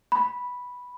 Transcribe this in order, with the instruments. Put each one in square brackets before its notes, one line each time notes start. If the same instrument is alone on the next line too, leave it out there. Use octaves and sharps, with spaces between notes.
[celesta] B5